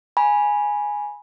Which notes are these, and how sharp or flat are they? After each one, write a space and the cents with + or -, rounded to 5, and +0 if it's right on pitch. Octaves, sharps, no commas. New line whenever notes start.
G#5 +0 B5 -25